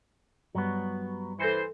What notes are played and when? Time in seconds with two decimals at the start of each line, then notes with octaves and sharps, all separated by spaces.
0.55 G2 F#3 G3 B3 C#6
1.40 E3 A4 C5 A#6 C#7